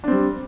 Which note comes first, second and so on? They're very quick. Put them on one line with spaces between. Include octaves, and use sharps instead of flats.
D4 C4 G3